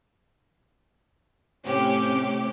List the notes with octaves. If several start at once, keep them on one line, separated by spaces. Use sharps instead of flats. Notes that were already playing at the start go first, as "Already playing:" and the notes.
A2 C3 C#4 G4